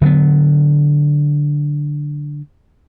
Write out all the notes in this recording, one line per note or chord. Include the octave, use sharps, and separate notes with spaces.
D3 F#3 G#3 B3